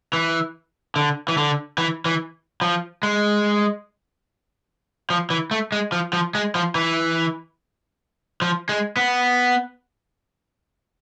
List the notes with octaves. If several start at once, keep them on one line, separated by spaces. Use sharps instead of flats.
E3
D3
E3
D3
E3
E3
F3
G#3
F3
E3
A3
G#3
F3
F3
G#3
F3
E3
F3
G#3
B3